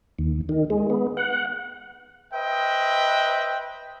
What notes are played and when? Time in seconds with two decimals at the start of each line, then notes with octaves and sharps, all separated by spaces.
0.19 D#2
0.49 D#3
0.70 G#3
0.90 B3
1.17 F#5
2.33 B4 C5 D#5 E5 G5